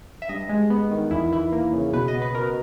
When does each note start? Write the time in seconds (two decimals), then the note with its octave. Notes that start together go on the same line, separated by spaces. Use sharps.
0.22 E5
0.29 G2 D#5
0.49 G#3
0.70 B3
0.91 D#3
1.11 E2 E4
1.31 E3 E4
1.52 A#3
1.73 C#3
1.93 B2 B4
2.08 D#5
2.14 B3
2.22 B4
2.35 B2 A#4